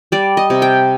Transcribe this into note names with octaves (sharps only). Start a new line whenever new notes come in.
G3 D5
D#5
C3
G5